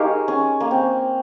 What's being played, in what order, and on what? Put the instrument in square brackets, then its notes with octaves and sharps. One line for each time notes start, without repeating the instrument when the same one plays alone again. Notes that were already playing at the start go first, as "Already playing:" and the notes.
Already playing: [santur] G#3 [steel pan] D#4 G4 A#4 C#5 F5
[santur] C#4
A#3
C4